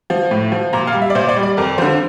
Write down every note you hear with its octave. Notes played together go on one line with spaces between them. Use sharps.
F3
A2
F3
A#2 A#5
F5
G3
E5
D5
A#2 C5
D5
G3
D5
F2 A#4
D3 F3 C5